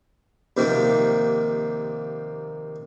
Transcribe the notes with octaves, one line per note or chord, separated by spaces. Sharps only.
D#2 C3 D#3 F3 A#3